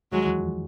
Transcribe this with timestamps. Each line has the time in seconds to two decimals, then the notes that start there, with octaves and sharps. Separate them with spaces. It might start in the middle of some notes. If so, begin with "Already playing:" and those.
0.12 D#2 D#3 F#3 G#3
0.26 E2 E3
0.40 F2 F3